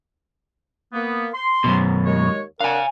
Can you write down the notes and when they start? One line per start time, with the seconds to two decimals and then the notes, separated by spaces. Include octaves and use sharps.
0.93 A#3 B3
1.34 C6
1.64 F#2 B2
2.06 D#2 G#3 C#5
2.61 D4 A#4 F5 F#5 G#5